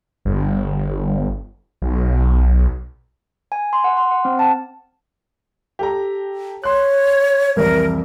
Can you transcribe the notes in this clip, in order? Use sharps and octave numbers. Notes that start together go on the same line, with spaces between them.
G1
B1
G#5
C6
F#5
C6
F#5
C4
A5
G4 A4 A#5
C#5 C6 F#6
C2 F2 E3 A#4